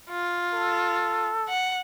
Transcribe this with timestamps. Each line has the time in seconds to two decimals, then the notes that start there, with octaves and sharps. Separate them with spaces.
0.10 F4
0.53 A4
1.49 F#5